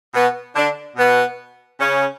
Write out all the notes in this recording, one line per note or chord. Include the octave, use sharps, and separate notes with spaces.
B2 B3
D3 D4
B2 B3
C#3 C#4